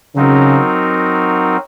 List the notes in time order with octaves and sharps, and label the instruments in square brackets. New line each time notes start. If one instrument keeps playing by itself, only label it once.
[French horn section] C#3 [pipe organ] F#3 C4 D#4 F#4 A#4